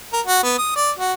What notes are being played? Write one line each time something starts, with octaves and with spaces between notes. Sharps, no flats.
A#4
F#4
B3
D#6
D5
F#4